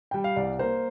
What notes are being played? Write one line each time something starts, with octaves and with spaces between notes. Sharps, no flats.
G3 G5
F5
C2 D5
A#3 C5